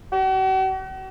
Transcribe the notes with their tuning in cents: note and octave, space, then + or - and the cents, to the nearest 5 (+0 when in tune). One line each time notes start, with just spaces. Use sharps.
F#4 +45